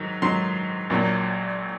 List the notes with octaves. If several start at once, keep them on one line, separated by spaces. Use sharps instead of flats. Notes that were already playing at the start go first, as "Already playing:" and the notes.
Already playing: G#2 D#3 F#3
G#2 D#3 F#3 C6
A#1 A#2 F#3 A#3